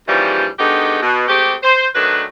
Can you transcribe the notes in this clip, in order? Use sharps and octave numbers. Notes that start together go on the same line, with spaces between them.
D#2 C#3 E3 F3 G3
D3 D#3 G#3 B3 D#4 G4
B2
G#3 A3 C4 G4
C5
D#3 F#3 A3 D4 B4